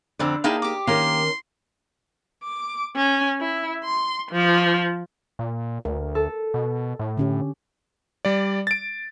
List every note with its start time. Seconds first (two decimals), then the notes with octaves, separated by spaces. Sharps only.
0.19 F2 D3 C4 D5
0.44 A#3 D#4 E4 G#4 G5 A5
0.62 G4 D6
0.87 D#3 A#3 C#4 A#4 C6
2.43 D6
2.96 C#4
3.40 E4
3.84 C6
4.31 F3
5.39 A#2
5.85 D2 A#4
6.15 A4
6.54 B2
6.99 A2
7.17 D3 C#4 G4
8.25 G3 D5
8.67 A6 D7